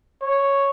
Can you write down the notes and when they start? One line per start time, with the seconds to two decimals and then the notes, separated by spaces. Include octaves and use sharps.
0.22 C#5